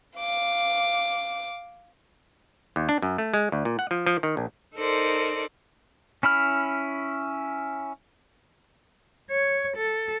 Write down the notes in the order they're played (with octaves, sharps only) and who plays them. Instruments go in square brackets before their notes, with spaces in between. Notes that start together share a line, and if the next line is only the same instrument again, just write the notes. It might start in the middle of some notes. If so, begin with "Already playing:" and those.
[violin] F5 D6
[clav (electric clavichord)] D#2
D4
F#2
A3
G#3
D2
A#2
F#5
F3
F3
D#3
A#1
[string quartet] D#4 A4 A#4 C5 D5
[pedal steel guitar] C#4 E4 B5 F6
[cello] C#5
A4